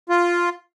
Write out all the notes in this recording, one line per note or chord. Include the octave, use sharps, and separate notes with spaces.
F4